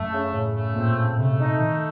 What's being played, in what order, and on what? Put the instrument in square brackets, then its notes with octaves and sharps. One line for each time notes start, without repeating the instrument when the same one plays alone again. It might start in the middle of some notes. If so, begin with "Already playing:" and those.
Already playing: [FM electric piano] F#2 [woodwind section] A3
[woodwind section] C#3
[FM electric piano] A2 [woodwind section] C#3
[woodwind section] A3
[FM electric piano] A#2 [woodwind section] C4
[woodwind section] C#3
[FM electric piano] C3 [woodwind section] A3
[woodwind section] D#4
[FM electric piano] D#3 [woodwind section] A3